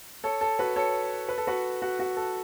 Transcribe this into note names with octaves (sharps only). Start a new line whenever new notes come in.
A4 C#5
A4
F#4 B4
A4 C#5
B4
A4
F#4 B4
F#4
F#4
A4